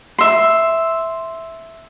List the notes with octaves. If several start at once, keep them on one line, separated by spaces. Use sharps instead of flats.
E5 C6